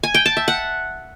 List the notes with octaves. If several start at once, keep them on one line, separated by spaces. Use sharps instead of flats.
G#5
G5
A5
E5
F#5